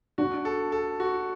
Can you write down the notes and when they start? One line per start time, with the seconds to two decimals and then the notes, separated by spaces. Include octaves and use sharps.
0.18 D4 F#4
0.45 A4
0.72 A4
1.00 F#4